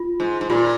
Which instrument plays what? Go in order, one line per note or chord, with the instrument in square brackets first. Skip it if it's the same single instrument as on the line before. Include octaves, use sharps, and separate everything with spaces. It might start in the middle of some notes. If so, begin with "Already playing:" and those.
Already playing: [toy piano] F4
[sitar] G#2
G#2
[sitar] A#2 [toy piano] F4